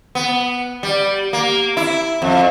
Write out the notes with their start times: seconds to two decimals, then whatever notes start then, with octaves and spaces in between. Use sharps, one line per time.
0.15 B3
0.83 G3
1.33 A#3
1.77 E4
2.22 F2